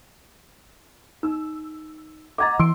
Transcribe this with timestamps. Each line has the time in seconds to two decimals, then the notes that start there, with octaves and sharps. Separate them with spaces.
1.23 D#4 E6
2.38 D#5 F#5 A#5 D6 G#6 A6
2.59 E3 C6 E6 D7